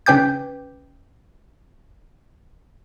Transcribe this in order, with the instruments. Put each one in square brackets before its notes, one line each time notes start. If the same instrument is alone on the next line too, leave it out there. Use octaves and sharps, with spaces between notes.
[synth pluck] C#3 C#4 B4 G5 D6 G6